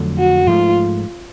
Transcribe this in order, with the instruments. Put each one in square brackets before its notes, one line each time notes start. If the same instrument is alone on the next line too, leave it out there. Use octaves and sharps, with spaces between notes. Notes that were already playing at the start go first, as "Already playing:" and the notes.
Already playing: [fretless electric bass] F2 D3 F#3 A3
[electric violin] F#4
[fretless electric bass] G#2 F3 A3 [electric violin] F4